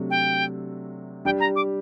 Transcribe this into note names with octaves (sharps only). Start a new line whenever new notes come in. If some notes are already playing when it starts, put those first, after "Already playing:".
Already playing: C3 F#3 A3 D4
G5
G3 D4 G4 G5
A#5
D6